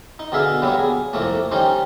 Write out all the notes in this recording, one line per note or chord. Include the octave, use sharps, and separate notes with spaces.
D#4
B2 D3 G#4 E5 F5
F#3 G3 A#3 B3
G#4
C2 F2 A3 A#3
D#3 G3 C#4 D#4 C5